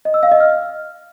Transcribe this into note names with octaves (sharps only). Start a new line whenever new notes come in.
D#5
E6
F5
D#5
F6